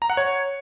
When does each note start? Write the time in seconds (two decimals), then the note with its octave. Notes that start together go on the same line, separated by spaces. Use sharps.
0.02 A#5
0.10 F#5
0.17 C#5